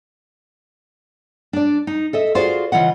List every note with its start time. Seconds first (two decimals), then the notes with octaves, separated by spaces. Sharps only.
1.53 D4 D5
1.87 D#4
2.13 A4 D#5 E5
2.35 F4 F#4 G#4 C5 D5 F5
2.72 C#3 E3 F4 D#5 F#5